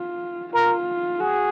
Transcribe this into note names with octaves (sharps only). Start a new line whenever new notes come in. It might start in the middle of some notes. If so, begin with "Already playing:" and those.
Already playing: F4
F4 A#4
F#4 G#4